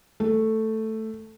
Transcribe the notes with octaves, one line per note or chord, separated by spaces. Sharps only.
A3